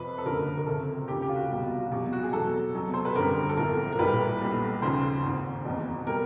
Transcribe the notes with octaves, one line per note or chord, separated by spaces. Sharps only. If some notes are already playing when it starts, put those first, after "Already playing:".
Already playing: F2 C3 F3 B4
A4
F#1 F#2 D3 F3 A#4
A#4
C#2 C3 F3 A4
F1 D#2 C#3 G4
G4
F4
F#4
C2 B2 G3
F4
F#4
E2 B2 F#3 G4
F#4
G#4
F1 E2 B2 F#3 A4
C2 B2 F#3
C5
B4
G#1 F#2 D3 G3 A#4
A4
B1 A2 F3 A#4
A#4
A#1 A2 E3 G3 B4
B1 A#2 G3
D#2 C#3 F3 C5
G#1 G#2 D#3
F#1 E2 B2
B2 G3 A#4